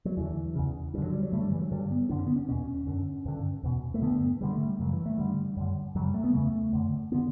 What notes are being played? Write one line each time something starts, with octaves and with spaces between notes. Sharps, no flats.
F#3
E2 D3 E3
E2 C#3
G2 D3
F#3
G3
F#3
G2 D3 A3
G3
E3
F#3
G2 D3 G3
B3
F#2 D3 D4
C#4
B3
C#4
E2 B2 C#4
F#2 D3
G2 D3
E2 B2
A3
G2 D3 B3
G2 D3 G3
A3
G3
F#2 C#3 F#3
E3
A3
G2 D3 G3
F#2 D3
F#2 C#3 F#3
G3
A3
B3
E2 C#3 A3
F#2 D3
D3 B3